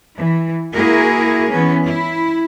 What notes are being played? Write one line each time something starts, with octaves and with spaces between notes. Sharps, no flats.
E3
A#3 E4 F#4 G#4 A#4
E3 B3 C#4
E4